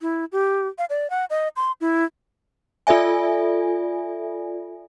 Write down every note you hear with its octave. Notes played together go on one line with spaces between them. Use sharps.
E4
G4
F5
D5
F#5
D#5
C6
E4
F4 A4 D5 E5 G#5